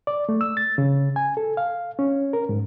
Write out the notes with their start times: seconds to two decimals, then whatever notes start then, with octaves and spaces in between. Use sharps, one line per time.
0.07 D5
0.29 A3
0.41 E6
0.57 A6
0.78 C#3
1.16 G#5
1.37 A4
1.57 F5
1.99 C#4
2.33 A#4
2.49 G#2